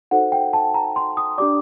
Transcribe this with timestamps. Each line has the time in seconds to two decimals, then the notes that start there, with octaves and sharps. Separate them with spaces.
0.11 D#4 F#4 A4 C5 F#5
0.32 G5
0.53 A5
0.74 A#5
0.96 C6
1.17 D#6
1.38 D4 G4 D5 D6